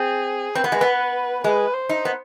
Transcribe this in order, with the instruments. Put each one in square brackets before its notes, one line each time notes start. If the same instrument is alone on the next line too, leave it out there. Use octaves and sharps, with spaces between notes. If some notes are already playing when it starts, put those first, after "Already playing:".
Already playing: [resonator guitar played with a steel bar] C4 [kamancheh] G#4
[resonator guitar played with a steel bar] C4 [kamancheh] B4
[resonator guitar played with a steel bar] B3
G#3
B3
[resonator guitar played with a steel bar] G#3 [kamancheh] B4
[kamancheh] C5
[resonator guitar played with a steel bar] D#4
B3